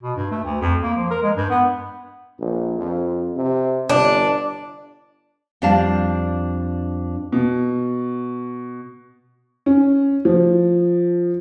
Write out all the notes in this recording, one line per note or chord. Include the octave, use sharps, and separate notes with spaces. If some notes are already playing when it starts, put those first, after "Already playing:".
B2
G2
A3
D2
F2
A#3
F3
A#4
G#3
G2
B3
A#1
F2
C3
G1 D4
F2 G3 D4 D5 F5 A5
B2
C#4
F3